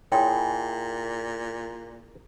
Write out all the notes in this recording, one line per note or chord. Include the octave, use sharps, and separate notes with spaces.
A#2 E4 G#4 C#5 G5 C6